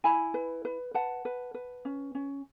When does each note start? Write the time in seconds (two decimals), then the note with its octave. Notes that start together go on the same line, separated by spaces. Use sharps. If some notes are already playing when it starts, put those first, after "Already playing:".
0.04 E4 G#5 B5
0.34 B4
0.65 B4
0.94 B4 F#5 A5
1.25 B4
1.54 B4
1.85 C#4
2.15 C#4